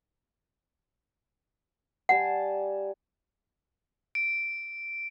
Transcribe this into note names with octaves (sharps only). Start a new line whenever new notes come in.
G3 F#5 G#5 A5
D7